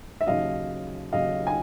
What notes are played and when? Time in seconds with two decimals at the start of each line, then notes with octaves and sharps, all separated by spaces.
0.21 E5
0.27 D#2 C#3 F#3 D#5 F5
1.13 D#2 C#3 F#3 D#5 F5
1.47 G#5